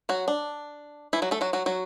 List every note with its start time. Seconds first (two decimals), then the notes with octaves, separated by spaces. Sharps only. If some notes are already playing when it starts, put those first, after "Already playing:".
0.09 F#3 F#4
0.28 D4
1.13 E3 E4
1.22 F#3 F#4
1.31 A3 A4
1.41 F#3 F#4
1.53 F#3 F#4
1.66 F#3 F#4